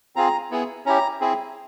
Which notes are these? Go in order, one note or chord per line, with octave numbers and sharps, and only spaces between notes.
C4 F4 G#4 A#5
B3 E4 G#4
C#4 E4 G4 A#5
C4 E4 G#4